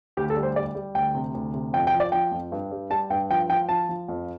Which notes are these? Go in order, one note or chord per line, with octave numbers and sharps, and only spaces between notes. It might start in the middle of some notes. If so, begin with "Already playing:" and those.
D2 G4
A4
G3
C5
G3 D5
G3
D2 G5
C3
D2
C3
F2 G5
G5
F3
D5
F3 G5
F2
G2
G3
G3 A5
G2 G5
F3 G5
F3 G5
F3 A5
F3
F2